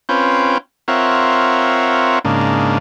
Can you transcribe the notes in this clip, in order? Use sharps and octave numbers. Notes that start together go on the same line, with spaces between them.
C4 C#4 F4 B4 G5
C4 F4 A#4 C#5 E5 F#5
G#2 C#3 A#3 D4